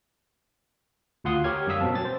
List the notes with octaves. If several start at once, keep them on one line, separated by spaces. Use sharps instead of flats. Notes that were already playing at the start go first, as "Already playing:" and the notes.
D2 F4 F#5 C6 D#6
G4 A#4 C#5 F6 G#6
F#2 G3 F5 D#6 E6 B6
B2 F#3 B3 C4 A5
C#4 A6
C5